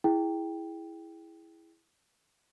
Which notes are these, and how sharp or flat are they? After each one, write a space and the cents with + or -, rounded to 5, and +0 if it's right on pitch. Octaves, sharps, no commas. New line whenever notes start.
E4 +0 G#4 +0 G5 +5